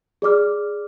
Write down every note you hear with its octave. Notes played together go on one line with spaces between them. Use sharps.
G#4 D5 D6 F6